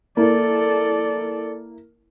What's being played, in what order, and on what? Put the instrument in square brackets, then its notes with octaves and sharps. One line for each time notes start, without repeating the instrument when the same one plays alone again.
[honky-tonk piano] A#3 E4 [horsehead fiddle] A4 D5